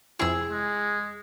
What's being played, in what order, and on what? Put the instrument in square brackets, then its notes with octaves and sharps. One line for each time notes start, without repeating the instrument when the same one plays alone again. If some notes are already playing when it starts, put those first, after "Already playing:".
[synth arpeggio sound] F2 C3 E4 [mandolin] G#4 E6
[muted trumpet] G#3